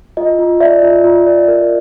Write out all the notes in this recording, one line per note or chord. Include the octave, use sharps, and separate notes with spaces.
F4 D#5
F4
D5 E5
F4
F4
D5
A#4